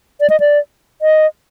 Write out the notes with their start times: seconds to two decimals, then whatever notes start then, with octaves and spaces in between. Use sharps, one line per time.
0.21 D5
0.30 D#5
0.40 D5
1.02 D#5